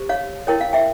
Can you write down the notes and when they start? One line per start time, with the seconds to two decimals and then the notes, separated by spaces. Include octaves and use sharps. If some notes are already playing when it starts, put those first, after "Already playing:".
Already playing: G4 C5
0.09 C#5 F5
0.47 E4 A#4 C#5 G5
0.61 F5
0.73 E5 G5